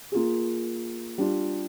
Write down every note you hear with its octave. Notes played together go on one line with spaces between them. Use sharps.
A#3 F4 G#4
G3 D4 F4